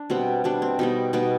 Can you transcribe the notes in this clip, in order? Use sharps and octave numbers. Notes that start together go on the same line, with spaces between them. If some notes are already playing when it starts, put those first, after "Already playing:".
Already playing: D4
B2 G3 B3 C4
B2 G3 B3 D4
C4
B2 G3 B3 D#4
B2 G3 B3 D#4